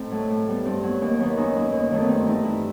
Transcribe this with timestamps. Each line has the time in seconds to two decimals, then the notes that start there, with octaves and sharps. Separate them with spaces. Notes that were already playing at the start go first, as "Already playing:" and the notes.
Already playing: A2 C4 D#4
0.11 F#3 A3
0.30 A2
0.48 G3 B3
0.65 G2 C4
0.83 F#3 B3
1.01 D#2
1.19 D#3 F#3 B3
1.37 F#2 D#4
1.55 F#3 B3
1.72 D#2
1.91 D#3 F#3 A3
2.02 B3
2.09 G2 C4
2.27 E3 A3 D#4
2.44 G2 E4